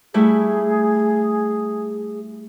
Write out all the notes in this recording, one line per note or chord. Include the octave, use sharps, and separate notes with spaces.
G3 A3 E4 G#4